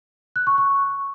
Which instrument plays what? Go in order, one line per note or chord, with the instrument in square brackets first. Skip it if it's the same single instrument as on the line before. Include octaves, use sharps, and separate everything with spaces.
[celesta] F#6
C#6
C#6